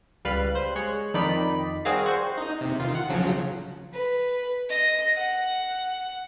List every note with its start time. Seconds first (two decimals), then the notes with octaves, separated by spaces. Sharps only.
0.25 C#2 G3 B4 F5 F#6
0.55 C5
0.75 G#3 C#5 F#6
1.14 F2 D#3 D#4 D5 B5
1.85 G3 C4 F#4 G#4 A#4 F5
2.06 F#4 C5
2.38 D#4
2.61 C3
2.79 D#3 F4
2.95 F#5
3.09 C#3 F3 F#3
3.94 B4
4.70 D#5
5.16 F#5